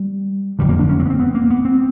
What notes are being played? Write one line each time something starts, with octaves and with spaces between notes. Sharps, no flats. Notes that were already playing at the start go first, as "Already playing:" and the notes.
Already playing: G3
F#1 F2 D3 G3
A#3
D4
C#4
C4
B3
C4
B3
A#3
B3
C4